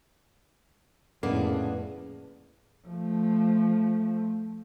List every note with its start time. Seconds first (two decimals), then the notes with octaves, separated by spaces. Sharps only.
1.23 F2 A2 C#3 A#3 B3 D4 G#4
2.88 F3 A3